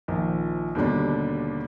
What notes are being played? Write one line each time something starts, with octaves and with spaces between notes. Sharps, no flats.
A#1 D#3 F3
D#2 B2 D3 G3 D4